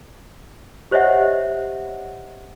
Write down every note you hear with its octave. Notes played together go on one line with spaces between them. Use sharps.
G4 C5 C#5 D#5 E5 F#5